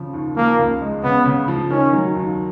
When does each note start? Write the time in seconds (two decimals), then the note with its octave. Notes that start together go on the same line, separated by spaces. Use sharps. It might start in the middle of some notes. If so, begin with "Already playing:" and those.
Already playing: C#3 F3
0.14 D#2
0.37 F3 A#3
0.59 C#2
0.82 G#3
1.03 C#3 B3
1.25 C#3
1.48 F3
1.70 D#3 C#4
1.93 F#3
2.15 D#2